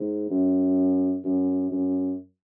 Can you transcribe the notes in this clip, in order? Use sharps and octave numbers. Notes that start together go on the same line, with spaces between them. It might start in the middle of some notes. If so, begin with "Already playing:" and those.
Already playing: G#2
F#2
F#2
F#2